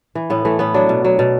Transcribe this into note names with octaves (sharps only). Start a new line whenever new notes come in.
E3
A2 B3
E3 A3
A2 B3
F#3 D4
B2
F#3
B2